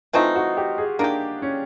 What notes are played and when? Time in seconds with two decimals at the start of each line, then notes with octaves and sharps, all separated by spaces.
0.13 E3 A3 C4 D#4 F4
0.35 F#4
0.57 G4
0.78 G#4
0.99 A#3 D4 D#4 G4
1.42 C#4